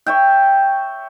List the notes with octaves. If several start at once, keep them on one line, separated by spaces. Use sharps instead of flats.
C#5 E5 G5